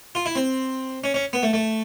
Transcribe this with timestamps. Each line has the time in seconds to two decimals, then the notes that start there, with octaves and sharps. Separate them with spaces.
0.15 F4
0.26 E4
0.35 C4
1.04 C#4
1.14 C#4
1.33 B3
1.43 A3
1.53 A3